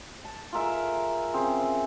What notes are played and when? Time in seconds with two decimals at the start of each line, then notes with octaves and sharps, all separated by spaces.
0.24 A5
0.53 F4 G#4 A#4 E5
1.34 C#3 C4 G#4